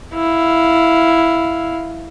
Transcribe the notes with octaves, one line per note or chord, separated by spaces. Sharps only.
E4 F5